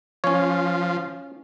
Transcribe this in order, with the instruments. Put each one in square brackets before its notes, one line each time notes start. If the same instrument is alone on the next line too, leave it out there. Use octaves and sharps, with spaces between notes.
[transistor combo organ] F3 [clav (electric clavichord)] C#4 C#5